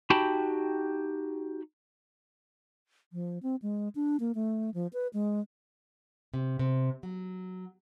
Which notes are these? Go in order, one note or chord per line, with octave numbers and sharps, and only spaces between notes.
D#4 F#4 G4 G5 A5 B5
F3
C4
G#3
D4
A#3
A3
F3
B4
G#3
C3
C3
F#3